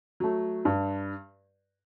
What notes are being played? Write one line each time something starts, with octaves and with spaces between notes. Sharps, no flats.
F#3 A3
G2